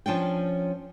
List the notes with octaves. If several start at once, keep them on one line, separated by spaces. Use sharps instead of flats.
F3 C#4 D4 G5